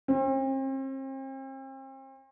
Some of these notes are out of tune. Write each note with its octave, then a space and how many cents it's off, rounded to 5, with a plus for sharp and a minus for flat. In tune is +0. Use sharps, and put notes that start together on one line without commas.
C4 +40